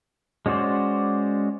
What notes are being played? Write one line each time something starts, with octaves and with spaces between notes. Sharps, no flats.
G#3 C#4 F#4 C5 D5